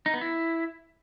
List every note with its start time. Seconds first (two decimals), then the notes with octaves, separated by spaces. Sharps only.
0.06 D#4
0.14 B3
0.21 E4